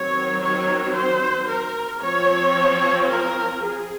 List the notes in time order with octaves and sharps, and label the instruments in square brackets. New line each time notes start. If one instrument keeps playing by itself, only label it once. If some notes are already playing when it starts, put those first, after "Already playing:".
Already playing: [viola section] D#3 F#3 C4 C#5
C#5
C5
A#4
F3 C4 C#5
A#4
G#4